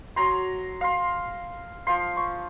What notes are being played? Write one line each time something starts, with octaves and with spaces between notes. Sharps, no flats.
F#3 A#5 C6
F5 C6
F3 F5 C6
C#6